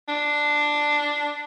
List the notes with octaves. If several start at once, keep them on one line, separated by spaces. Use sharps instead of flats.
D4